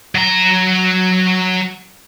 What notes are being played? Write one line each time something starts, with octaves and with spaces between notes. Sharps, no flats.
F#3 A#5